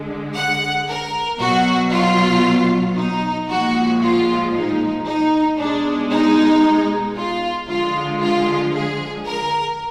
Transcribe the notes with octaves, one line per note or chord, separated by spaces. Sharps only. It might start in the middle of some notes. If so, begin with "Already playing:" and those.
Already playing: D3 G#3
F#5
A#4
B2 F#3 F#4
F4
D#4
A#2 F3 G#3 F#4
F4
D#4
D#4
B2 G#3 D4
D#4
F4
D3 F3 G#3 F4
F4
G#4
A#4